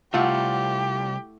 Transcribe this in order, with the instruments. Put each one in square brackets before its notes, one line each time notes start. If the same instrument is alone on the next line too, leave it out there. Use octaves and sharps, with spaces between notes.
[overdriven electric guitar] C2 [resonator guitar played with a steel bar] A3 E4 F#5 [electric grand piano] F4 [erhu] G4